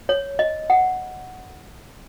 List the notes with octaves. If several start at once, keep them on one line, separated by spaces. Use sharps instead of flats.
C#5
D#5
F#5